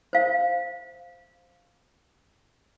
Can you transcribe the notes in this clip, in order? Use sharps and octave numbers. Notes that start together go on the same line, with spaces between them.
C5 F5